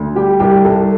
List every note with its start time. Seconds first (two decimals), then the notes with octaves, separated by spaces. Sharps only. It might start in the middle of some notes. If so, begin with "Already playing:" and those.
Already playing: D2
0.15 G3 G4
0.40 C2 G4
0.64 C2 A4